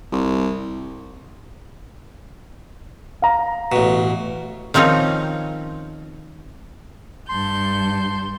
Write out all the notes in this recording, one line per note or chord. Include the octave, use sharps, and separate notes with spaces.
C2
F5 A#5
A1 B2
D#3 F3 C4 C#4 D#4
G2 A5 C6 G6